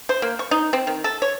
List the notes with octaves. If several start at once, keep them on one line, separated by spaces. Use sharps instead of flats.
C5
A#3
C#6
D#4
C4
D#3
A4
C#5